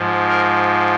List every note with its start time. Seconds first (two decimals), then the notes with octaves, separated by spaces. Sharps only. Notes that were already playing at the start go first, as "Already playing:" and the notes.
Already playing: G#2 F3
0.29 A#4